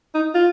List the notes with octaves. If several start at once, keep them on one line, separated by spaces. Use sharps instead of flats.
D#4
F4